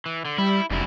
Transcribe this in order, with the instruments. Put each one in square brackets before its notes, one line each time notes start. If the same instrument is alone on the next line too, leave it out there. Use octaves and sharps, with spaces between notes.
[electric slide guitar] E3
D3
[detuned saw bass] G3 [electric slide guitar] E4
[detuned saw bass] F1 [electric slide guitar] F#2 G3 E4